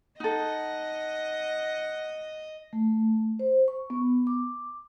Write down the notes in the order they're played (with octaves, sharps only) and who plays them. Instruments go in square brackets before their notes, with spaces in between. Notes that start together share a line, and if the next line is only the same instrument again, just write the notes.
[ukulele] D#4 A4 [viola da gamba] D#5 [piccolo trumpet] F#5
[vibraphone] A3
C5
C#6
B3
D6